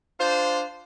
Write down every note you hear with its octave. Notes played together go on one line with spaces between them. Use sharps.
D4 F4 C5